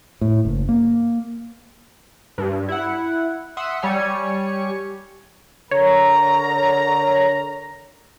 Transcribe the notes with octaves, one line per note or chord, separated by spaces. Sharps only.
A2
F#1
A#3
G2
E4 F#5
E5 F#5 C6 D#6 E6 F#6
G3 C#5 G#5 C#7
D3 A#4 C#5 A#5